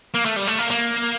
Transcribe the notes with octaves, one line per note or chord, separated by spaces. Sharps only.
A#3
A3
G3
A3
A#3
A#3